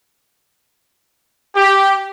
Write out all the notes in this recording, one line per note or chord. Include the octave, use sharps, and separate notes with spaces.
G4